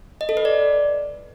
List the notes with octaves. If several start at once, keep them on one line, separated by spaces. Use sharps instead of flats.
D#5
A4
B4
D5